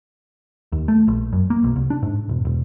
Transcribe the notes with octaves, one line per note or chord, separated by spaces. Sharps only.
D#2
A3
A#1
F#2
A#3
B1
C2
D4
G#2
E1
E1